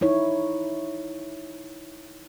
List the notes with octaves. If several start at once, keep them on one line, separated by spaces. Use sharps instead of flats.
D#4 E4 C#5